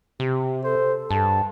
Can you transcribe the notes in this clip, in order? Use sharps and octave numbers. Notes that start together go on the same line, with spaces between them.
C3 G4
A4 C5
G2 A5